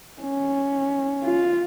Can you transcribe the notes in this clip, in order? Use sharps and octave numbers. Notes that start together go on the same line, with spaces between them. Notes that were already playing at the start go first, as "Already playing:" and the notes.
C#4
F4